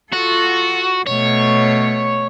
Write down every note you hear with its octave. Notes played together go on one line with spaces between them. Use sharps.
F4 F#4 A4
B2 A3 C#5